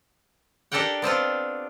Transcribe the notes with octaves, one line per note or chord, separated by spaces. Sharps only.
D4 G4 A4 A#4 F#5 G5
B3 C4 D4 F4